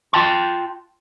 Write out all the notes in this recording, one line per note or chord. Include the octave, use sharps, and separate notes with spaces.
F4 G5 A5 C6